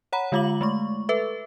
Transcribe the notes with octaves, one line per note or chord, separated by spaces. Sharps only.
C#5 F#5 A#5 B5
D3 G#3 F4 F5 D6 F#7
G#3 A3 C#6
A4 B4 E5